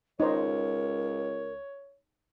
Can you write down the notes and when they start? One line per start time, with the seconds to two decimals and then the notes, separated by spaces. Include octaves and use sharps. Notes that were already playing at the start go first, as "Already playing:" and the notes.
0.20 C#2 D#4 A#4 C5 C#5